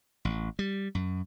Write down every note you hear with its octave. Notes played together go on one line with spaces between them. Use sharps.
A1
G3
F#2